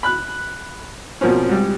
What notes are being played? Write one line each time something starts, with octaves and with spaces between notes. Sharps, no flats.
B5 F#6
B2 F3 A#3 C4 C#4
G#2 G3